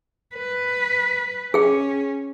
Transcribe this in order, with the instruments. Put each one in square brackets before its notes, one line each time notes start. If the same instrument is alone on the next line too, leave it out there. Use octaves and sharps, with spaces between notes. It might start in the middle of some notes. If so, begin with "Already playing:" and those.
[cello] B4
[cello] C#4 [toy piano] G#4 G5